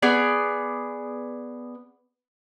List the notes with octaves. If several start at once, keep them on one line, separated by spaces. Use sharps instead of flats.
B3 G#4 D5